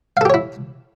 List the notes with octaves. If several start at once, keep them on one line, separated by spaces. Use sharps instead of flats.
E4 G4 A4 C#5 F5